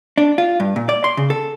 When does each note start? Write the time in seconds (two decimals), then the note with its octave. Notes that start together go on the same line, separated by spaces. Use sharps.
0.18 D4
0.38 F4
0.60 G2
0.76 A#2
0.89 D5
1.04 C6
1.17 C#3
1.30 A4